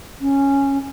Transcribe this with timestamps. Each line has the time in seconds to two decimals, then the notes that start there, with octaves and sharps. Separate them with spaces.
0.21 C#4